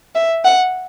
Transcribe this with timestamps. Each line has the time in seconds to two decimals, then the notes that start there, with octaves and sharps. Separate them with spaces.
0.15 E5
0.44 F#5